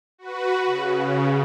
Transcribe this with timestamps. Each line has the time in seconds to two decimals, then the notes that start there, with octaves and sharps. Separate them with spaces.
0.18 F#4 B4
0.65 C#3